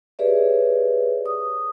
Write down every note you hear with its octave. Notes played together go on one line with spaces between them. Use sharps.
G4 G#4 B4 C#5 D5 E5
D#6